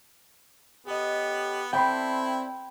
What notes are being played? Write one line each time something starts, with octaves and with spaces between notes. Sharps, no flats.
B3 C#4 G4 A4 D#5
C4 E4 A4 C5 D5 G5 B5 C6